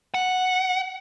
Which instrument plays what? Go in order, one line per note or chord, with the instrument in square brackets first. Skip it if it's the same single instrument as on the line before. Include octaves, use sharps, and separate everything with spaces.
[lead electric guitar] F#5